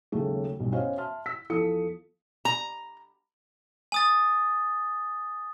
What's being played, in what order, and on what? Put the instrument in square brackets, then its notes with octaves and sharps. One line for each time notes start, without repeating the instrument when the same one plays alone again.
[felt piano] D#2 C#3 F#3 G#3 A3
B1 G2
B3 C#4 F#4 C5 D#5 F5
E5 A5 C6 F6
E6 B6
E2 F3 A4 D#6 C#7
[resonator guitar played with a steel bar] A#5
[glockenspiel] G#5 D#6 A6